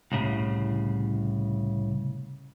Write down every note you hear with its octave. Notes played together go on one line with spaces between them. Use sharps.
C2 A2 C#3